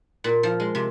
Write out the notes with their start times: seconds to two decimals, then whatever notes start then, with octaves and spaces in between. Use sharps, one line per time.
0.24 A#2
0.43 F3
0.60 G#3
0.75 C3